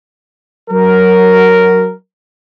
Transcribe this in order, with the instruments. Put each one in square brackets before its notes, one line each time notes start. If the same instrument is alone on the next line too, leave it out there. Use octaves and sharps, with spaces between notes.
[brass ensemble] F#3 A#4